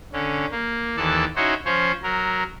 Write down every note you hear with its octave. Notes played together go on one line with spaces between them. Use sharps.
D3 C#4
A#3
D#2 E3 A4 D5 A5
C#4 D#4 E4 F#4 C5 C#5
F3 C#4 C5 C#5
F#3 A#4